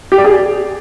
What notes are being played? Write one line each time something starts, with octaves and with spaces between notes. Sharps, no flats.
G4
D5
G#4
D5